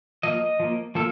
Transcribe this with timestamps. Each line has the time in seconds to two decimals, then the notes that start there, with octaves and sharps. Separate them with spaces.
0.23 F3 A#3 D#5
0.60 F3 A#3
0.95 F3 A#3 A4